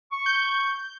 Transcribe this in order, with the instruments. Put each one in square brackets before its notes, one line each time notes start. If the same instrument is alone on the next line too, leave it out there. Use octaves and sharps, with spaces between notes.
[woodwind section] C#6
[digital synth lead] G6